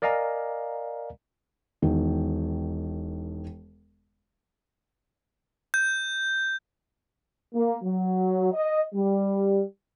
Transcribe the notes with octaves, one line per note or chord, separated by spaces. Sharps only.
A#4 D5 D#5 F5 G#5 A#5
E1 D#3
G6
A#3
F#3
D#5
G3